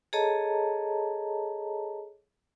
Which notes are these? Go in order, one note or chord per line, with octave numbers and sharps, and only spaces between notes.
G#4 A4 C#5 D#5 A5 A#5